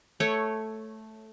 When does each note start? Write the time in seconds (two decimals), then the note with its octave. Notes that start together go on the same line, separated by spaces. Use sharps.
0.20 A3 C#5